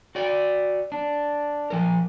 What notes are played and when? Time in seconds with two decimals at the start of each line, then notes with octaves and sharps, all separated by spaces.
0.15 F#4 D5
0.92 D4
1.70 F3 A#4